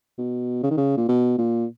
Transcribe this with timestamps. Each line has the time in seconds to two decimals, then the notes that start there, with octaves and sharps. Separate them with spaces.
0.18 B2
0.63 C#3
0.71 D#3
0.77 C#3
0.97 A#2
1.09 B2
1.38 A#2